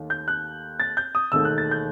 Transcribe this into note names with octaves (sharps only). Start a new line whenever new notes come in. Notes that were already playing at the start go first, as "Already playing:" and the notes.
Already playing: D#2 D#3 A3
G6
F#6
A6
G6
D#6
E1 D#2 D#3 A3 E6
F#6
A6
G6